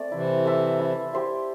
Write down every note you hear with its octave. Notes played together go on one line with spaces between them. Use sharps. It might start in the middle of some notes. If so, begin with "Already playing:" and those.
Already playing: A3 C4 A4 D5
C3 E3 E4
A4 C5 E5
E4
G4 C5 E5